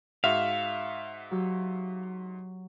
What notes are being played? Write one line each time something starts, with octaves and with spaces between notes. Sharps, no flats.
G#2 F#4 E5 F5
F#3 G4 E6